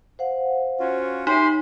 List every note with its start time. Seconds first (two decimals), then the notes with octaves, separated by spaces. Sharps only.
0.19 C5 F5 F#5
0.80 C#4 F4 F#4
1.27 D#4 G4 B4 C#5 E5 B5 C6